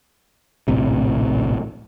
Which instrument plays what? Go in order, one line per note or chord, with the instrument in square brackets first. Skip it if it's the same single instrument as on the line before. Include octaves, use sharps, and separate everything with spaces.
[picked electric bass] D1 A#1 A2 C3